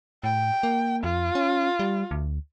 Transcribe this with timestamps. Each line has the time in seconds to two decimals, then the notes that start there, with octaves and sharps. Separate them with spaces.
0.24 A2 G5
0.63 A#3
1.03 F2 F4
1.35 C#4
1.79 G3
2.11 D2